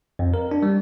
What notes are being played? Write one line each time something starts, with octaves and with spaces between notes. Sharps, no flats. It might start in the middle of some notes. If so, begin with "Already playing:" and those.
F2
A#4
D4
G3